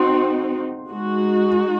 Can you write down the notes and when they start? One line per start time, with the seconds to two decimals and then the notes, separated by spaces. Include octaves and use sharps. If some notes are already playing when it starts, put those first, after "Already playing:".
Already playing: C4 D#4 F#4 C6
0.89 G#3 D#4 F#4